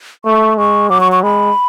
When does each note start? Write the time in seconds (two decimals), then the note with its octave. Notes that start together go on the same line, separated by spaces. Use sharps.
0.25 A3 C#6
0.57 G#3 C#6
0.90 F#3 D6
1.01 C#6
1.12 C#6
1.23 G#3 B5